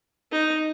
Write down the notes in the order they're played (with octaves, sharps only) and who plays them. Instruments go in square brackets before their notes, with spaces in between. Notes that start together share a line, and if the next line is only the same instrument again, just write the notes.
[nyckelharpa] D#4